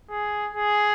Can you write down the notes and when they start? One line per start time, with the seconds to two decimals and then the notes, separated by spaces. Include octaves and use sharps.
0.11 G#4
0.53 G#4